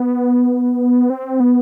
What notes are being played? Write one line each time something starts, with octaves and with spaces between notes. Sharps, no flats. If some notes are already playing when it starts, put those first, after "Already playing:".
Already playing: B3
C4
B3